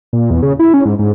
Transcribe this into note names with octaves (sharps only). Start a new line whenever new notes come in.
A#2
E2
C#3
E4
C#4
G#2
G#2